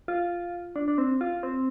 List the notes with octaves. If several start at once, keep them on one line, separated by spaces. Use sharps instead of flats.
F4
D4
D4
C4
F4
C4